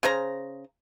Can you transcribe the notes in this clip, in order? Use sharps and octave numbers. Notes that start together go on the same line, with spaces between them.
C#3 G#4 C5 A#5